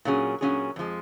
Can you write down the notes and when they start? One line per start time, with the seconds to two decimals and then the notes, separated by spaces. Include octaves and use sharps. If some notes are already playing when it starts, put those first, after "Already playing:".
0.05 A#2 F#3 C#4 G#4
0.41 A#2 F#3 C#4 G#4
0.76 F2 F3 G#3